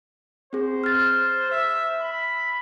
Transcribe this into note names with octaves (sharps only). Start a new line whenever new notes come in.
C4 G#4 C5
F6 A6
E5
B5